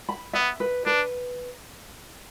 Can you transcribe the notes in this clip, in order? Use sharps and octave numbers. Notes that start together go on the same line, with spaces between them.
B5
B3 E5
B4
D4 B4